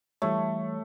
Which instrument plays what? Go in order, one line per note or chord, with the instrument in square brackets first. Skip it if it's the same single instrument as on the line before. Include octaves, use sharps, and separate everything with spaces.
[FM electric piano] E3 G3 C#5 [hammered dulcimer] A3